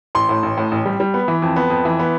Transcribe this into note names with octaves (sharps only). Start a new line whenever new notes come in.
A1 C6
A2
A1
A2
A1
G3
G3
B3
E3
F2
B3
F2
E3
B3